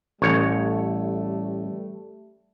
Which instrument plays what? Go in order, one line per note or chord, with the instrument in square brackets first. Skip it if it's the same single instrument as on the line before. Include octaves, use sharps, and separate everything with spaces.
[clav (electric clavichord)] A1 C#5 [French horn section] G3 A3